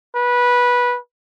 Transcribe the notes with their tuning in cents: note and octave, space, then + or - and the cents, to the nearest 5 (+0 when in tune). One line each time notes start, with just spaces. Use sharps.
B4 -15